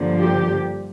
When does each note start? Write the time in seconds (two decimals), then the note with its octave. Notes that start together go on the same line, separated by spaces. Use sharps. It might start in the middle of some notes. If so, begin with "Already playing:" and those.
Already playing: G2 D3 F3 A#3
0.21 G4